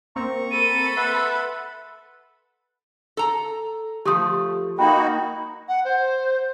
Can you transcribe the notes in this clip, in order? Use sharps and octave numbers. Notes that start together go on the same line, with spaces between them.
A#3 C4 A#5 C#6
A4 B5 D#7
B4 E5 F#5 C6 E6
A4 A#5
F3 A3 G4 D#6
A#3 D#4 F#4 G5 B5
F#5
C5